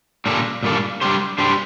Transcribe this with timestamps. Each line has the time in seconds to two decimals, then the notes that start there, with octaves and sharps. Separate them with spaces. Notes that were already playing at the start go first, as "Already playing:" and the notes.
0.26 A#2 G3 A#3 D4 A4
0.63 A#2 G3 A#3 D4 A4
1.01 G3 D4 G4 C5
1.38 G3 D4 G4 C5